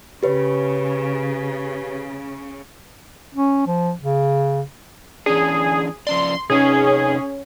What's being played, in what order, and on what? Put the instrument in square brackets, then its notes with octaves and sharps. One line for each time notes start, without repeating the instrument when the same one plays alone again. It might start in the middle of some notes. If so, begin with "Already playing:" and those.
[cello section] C#3 [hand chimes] G4 B4 C#5
[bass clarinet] C#4
F3
C#3
[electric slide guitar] E3 C#4 D4 [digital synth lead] G#4
[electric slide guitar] F3 C#4 D5 [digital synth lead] C6
[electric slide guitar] C3 D#4 [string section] C#4 [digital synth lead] G#4